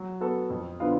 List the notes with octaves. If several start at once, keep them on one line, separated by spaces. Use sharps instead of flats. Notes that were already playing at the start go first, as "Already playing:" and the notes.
Already playing: F#3
B3 F#4 A4
F2
D3 F3 B3 F4